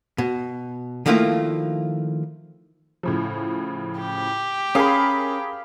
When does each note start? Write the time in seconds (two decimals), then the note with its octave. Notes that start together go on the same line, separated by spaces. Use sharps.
0.18 B2
1.06 D#3 F3 A3 A#3 E4 F4
3.03 A2 C#3 F3
3.99 G4
4.75 C#4 G#4 A#4 F5 B5 D#6